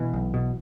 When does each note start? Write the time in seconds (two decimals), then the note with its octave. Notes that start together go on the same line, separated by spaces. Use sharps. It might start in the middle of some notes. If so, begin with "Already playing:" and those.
Already playing: B2 E3
0.14 B1
0.34 B2